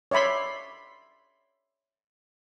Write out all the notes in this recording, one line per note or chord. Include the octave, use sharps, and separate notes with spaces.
C#5 D5 E5 B5 C6